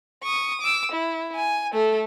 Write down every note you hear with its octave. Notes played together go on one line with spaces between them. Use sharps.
C#6 D#6
D6 E6
E4
G#5
A3 A4